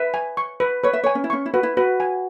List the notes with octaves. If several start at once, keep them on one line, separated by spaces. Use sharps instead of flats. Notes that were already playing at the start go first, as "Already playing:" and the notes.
Already playing: B4 E5
G#5
C#6
B4
B4 C#5
E5
C#5 G#5
C#4
E4
C#4 C#6
E4
F#4 B4
E4
F#4 B4
G#5